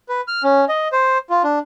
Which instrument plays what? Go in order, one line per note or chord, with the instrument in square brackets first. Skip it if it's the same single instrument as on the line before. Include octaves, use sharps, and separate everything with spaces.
[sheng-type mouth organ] B4
F6
C#4
D#5
C5
F4
D4